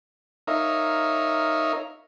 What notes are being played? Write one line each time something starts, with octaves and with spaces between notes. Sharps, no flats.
D#4 A#4 C#5 E5 F5